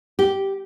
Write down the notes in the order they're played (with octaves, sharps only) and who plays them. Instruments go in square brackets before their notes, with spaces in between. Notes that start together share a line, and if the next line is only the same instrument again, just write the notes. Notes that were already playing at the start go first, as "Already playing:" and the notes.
[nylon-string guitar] G4